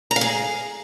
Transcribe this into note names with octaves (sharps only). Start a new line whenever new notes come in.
A#5
F5
G#4